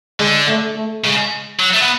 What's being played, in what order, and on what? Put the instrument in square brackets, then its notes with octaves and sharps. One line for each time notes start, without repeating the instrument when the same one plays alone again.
[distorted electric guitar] D3 [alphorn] G#3
[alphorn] A3
A3
[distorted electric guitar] C#3 [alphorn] G#3
[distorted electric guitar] F#3
A3
B3